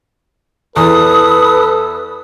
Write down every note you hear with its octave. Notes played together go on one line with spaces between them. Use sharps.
E2 A4 B4 D#6